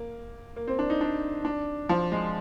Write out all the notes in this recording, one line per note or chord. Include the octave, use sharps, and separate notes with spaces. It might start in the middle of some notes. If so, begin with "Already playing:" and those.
Already playing: A#3
A#3
C4
D4
D#4
D4
D4
F3
G#3